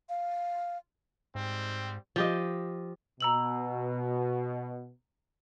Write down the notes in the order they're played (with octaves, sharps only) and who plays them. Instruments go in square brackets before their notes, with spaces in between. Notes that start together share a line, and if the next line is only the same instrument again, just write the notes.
[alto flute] F5
[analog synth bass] G#2 [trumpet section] G3 C4
[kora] F3 G4 D#5
[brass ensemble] B2 [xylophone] A#5 E6 F#7